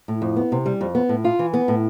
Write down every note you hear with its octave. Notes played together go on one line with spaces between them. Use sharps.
A2
F2
B3
C3
G3
F2
B3
A2
F4
E3
B3
A2